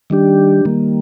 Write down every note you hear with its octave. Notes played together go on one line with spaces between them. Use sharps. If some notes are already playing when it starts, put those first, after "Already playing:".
D#3 G3 D4 G4
D#3 G3 A#3